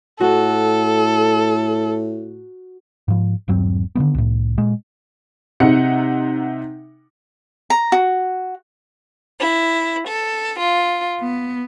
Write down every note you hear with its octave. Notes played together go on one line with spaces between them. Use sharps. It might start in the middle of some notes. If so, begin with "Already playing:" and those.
A2 F#4 A4
G#2 F3
D#1 G2 F#3 C4
D3 D#3 G#3 B3
C2 A2
A#2 G#3
C3 D#4 F#5 C#7
A#5
F#4
E4
A4
F4
B3